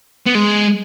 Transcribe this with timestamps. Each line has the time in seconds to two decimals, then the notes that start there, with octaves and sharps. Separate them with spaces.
0.26 B3
0.35 G#3